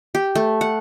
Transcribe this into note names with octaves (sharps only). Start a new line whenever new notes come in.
G4
A3
F#5